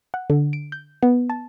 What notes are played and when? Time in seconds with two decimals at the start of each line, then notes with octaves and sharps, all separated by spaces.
0.14 F#5
0.30 D3
0.53 D7
0.72 G6
1.03 B3
1.30 A5